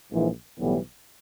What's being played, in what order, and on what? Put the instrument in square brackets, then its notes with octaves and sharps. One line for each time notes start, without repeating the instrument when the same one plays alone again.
[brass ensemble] A#1 G#2 E3
B1 A2 E3 G3 B3